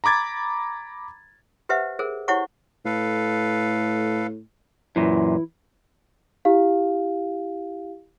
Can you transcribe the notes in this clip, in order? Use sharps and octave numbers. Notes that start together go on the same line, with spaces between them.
A#5 B5 D6 G#6 A6
G4 B4 C5 E5 F#5
G#4 A#4 C5
E4 G4 C5 C#5 F#5 C#6
A2 A4 B4 F5
F#2 A#2 E3 E4
E4 G4 F5